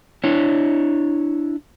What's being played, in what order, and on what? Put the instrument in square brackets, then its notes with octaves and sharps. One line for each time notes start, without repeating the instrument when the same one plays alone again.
[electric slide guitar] D4 E4 C#5